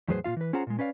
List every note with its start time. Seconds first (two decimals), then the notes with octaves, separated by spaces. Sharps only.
0.08 E2 A2 F#3 G#4 B4 C5
0.24 A#2 C#3 F4 F5
0.37 E3 B4
0.53 C#4 F4 G#4 C5 F#5 A#5
0.67 A#2 G#3
0.79 C#4 B4 D5 F5